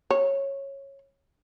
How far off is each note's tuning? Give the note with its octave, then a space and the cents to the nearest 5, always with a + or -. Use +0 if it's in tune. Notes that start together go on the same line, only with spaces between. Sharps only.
C#5 -10